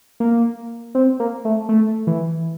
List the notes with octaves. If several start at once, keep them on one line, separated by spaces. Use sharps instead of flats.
A#3
C4
A#3
A3
A3
E3